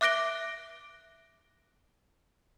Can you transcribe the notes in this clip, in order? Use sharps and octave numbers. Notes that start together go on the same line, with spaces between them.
E5 D6 F#6 A#6 D7 G7